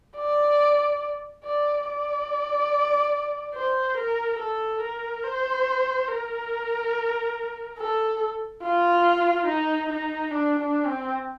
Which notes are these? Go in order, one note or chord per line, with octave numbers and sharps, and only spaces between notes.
D5
D5
D5
C5
A#4
A4
A#4
C5
A#4
A4
F4
D#4
D#4
D4
D4
C4